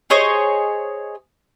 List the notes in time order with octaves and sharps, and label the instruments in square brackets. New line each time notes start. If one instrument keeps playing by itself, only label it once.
[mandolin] G#4 C5 C#5 D#5